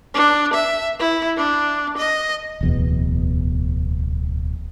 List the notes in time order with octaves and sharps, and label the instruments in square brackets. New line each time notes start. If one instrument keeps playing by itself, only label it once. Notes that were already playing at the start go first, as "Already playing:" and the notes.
[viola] D4
E5
E4
D4
D#5
[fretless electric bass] D1 E2 B2